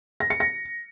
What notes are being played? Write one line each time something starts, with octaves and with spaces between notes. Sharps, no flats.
A#6
C#7
A#6